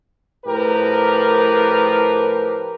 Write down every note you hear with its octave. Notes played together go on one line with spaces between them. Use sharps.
A2 F3 G4 A#4 B4